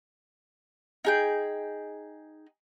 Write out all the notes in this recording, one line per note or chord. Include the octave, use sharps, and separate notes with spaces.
D#4 G#4 G5